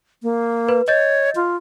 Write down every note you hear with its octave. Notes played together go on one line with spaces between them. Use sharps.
A#3
B4
C#5 D#5 G6 A6
F4